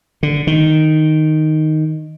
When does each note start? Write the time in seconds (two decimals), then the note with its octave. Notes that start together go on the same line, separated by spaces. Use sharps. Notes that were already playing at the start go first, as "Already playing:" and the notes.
0.23 D3
0.47 D#3